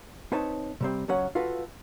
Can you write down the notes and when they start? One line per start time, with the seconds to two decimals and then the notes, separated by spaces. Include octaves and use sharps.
0.32 C4 D#4 B4 C#5 A5
0.81 C3 G3 C4
1.08 C#2 F#3 C#4 F#5
1.35 F4 F#4 A4 B4 F5